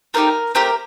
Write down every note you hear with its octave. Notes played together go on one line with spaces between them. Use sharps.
A3 C4 D#4 G4 A#4
A3 C4 G4 A#4